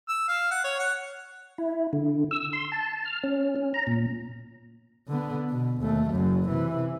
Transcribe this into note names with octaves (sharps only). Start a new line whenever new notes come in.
E6
F5
F#5
C#5
F#5
E4
D3
E6
C6
A5
F6
C#4
C#4
A#5
A#2
D3 B3
B2
D#2 A3
F#1 F#2
C3 E3